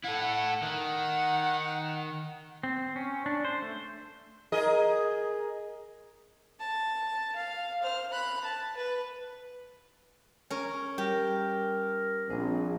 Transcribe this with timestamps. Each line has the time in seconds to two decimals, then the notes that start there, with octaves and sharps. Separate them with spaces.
0.04 E4 A4 F#5
0.63 D#3 F#5
2.63 C4
2.96 C#4
3.26 D4
3.45 C5
3.62 A3
4.52 G#4 A#4 D#5
6.60 A5
7.35 F5
7.83 C5 F6
8.12 B5 F#6
8.44 A5
8.76 B4
10.50 C#4 A#4
10.98 G3 G4 A#4
12.29 A#1 C4 G#4